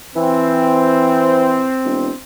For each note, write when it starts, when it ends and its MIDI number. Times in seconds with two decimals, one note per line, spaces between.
0.16 1.70 52
0.16 2.19 60
1.85 2.10 28